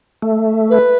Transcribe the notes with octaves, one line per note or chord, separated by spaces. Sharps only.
A3
B4